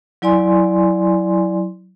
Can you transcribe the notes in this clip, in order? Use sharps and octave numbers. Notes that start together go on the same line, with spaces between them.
F#3 E4 D5 G#5 C6